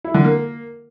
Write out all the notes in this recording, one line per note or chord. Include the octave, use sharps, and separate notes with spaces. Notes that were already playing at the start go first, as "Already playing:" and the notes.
E4
D3
A#3